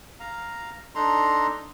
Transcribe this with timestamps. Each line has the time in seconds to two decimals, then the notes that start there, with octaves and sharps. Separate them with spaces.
0.20 F5 A#5
0.95 D4 D#4 A4 A#5 C6